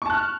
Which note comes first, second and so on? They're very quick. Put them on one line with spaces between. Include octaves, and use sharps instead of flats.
C#6 A5 F#6 F6